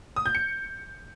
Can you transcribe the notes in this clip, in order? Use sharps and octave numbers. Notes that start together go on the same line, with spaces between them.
D#6
G6
C#7